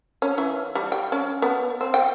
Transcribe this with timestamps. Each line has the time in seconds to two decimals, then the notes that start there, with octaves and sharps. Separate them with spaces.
0.22 C#4
0.38 E3
0.75 G3
0.92 G5
1.12 C#4
1.42 B3
1.81 C4
1.94 G5